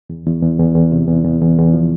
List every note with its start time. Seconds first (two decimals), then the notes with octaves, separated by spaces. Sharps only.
0.10 E2
0.27 E2
0.43 E2
0.59 E2
0.75 E2
0.92 C3
1.08 E2
1.25 E2
1.41 E2
1.58 E2
1.74 F3